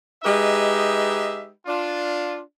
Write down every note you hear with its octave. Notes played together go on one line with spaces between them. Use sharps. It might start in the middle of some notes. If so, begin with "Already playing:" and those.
G#3 D#4 G4 B4 D#5 E5
D4 F4